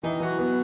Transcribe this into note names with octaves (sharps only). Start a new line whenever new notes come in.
D#3 E3 D#4
E3 F#3 F#4
B3